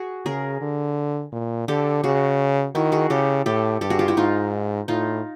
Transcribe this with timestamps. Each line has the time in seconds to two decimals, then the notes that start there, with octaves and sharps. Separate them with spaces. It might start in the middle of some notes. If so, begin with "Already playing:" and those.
Already playing: F#4 G#4
0.26 C#3 G#4 A#4
0.61 D3
1.32 A#2
1.68 D3 G4 A4
2.03 C#3 F#4 G#4
2.75 D#3 E4 F#4
2.92 F#4 G#4
3.10 C#3 G4 A4
3.46 A2 G4 A4
3.81 G2 G4 A4
3.90 F#4 G#4
3.99 F4 G4
4.08 E4 F#4
4.17 G#2 D#4 F4
4.88 A2 D#4 F4